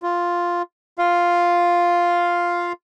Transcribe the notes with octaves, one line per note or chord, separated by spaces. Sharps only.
F4
F4 F5